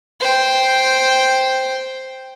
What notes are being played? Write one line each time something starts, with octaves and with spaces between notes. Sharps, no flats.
C5 G5